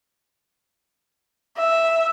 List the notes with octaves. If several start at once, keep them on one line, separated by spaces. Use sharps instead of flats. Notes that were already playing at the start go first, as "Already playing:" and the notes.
E5